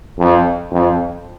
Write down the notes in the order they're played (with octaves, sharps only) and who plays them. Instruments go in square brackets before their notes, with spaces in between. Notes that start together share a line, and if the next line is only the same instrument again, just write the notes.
[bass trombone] F2
F2